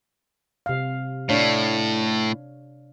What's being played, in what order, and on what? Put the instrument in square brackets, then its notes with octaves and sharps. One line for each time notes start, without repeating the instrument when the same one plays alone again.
[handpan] C3 F5
[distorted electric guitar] A2 [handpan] D4 C#5 F5